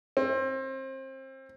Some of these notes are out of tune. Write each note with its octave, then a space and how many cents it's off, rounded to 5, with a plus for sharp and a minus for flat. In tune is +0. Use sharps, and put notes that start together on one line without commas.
C4 +30